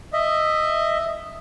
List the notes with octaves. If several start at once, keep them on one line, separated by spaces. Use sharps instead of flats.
D#5 E5